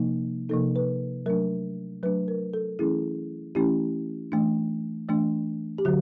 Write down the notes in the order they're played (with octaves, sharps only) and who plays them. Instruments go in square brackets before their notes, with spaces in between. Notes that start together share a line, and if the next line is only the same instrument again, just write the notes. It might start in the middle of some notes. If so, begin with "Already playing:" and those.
Already playing: [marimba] C3 F3 A#3 D#4
C3 F3 A#3 D#4 A4
B4
F#3 A3 D4 A#4
F#3 A3 D4 B4
A#4
A4
E3 A3 C#4 E4 G#4
E3 A3 C#4 E4 G4
E3 A3 D4
E3 A3 D4
G4
D3 F#3 F#4